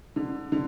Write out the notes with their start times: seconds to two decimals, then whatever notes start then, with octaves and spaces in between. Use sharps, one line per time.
0.16 D3
0.52 D3